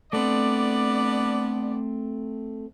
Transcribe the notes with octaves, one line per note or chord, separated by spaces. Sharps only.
A3 B3 C4 D4 D5